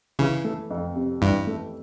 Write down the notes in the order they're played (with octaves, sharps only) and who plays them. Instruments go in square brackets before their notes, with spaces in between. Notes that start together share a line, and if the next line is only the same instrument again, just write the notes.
[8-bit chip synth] C#3 [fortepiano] E3
[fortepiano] A3
F2
C3
[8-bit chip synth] G2 [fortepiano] E3
[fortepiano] A3